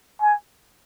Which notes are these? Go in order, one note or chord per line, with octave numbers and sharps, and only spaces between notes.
G#5